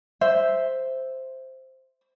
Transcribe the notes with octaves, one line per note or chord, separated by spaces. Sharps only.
C5 E5